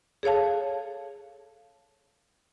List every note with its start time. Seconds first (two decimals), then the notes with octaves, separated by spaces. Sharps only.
0.23 G#4 A4 C#5 F5 A5